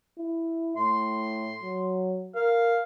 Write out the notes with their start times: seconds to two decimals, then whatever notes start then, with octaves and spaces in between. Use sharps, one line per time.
0.18 E4
0.77 A2 C6
1.62 F#3
2.35 A#4 F5